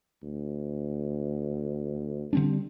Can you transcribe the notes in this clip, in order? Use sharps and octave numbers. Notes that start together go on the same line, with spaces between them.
D2
D3 G3 C4 D4